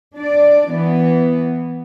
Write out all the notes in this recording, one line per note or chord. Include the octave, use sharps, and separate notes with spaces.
D4 D5
E3 B3